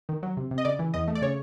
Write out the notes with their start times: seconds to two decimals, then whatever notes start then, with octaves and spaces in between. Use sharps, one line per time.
0.09 D#3
0.23 F#3
0.37 C3
0.51 C3
0.58 D#5
0.65 C#3 D5
0.79 E3
0.94 E2 D#5
1.08 A3
1.15 D5
1.22 C#3 C#5